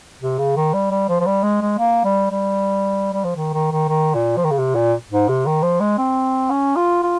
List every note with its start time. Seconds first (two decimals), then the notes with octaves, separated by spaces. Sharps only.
0.21 C3
0.38 C#3
0.57 D#3
0.73 G3
0.91 G3
1.09 F3
1.20 F3
1.26 G3
1.43 G#3
1.62 G#3
1.78 A#3
2.04 G3
2.31 G3
3.13 G3
3.24 F3
3.36 D#3
3.53 D#3
3.71 D#3
3.88 D#3
4.14 A#2
4.37 F3
4.44 D#3
4.51 C#3
4.58 C3
4.75 A#2
5.10 G#2
5.29 C3
5.46 D#3
5.63 F3
5.80 G#3
5.98 C4
6.50 C#4
6.76 F4
7.03 F4